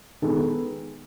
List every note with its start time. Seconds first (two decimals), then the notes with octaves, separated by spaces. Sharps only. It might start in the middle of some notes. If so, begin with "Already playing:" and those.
0.22 D#3 G#3 B3 A4